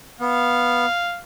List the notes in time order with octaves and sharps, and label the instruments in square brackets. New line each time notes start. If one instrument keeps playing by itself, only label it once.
[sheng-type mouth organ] B3 [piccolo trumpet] F5